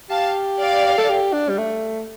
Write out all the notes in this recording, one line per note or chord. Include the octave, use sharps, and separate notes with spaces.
G4 F5 A5
D5 F5
A4
G4
D4
G3
A3